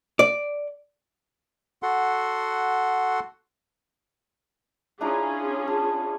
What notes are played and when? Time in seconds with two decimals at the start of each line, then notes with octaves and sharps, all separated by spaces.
0.19 D5
1.83 F#4 A4 F#5 C6
5.01 C#4 D4 E4 F4 G#4 A#5
5.67 A5